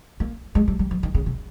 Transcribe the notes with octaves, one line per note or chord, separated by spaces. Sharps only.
A#3
G#3
G3
G3
F3
D#3
C#3
C3